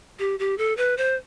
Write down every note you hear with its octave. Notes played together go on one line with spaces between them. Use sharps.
G4
G4
A4
B4
C5